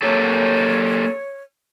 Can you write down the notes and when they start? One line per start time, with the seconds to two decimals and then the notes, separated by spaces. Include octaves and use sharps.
0.02 A#3 G4 A4 C#5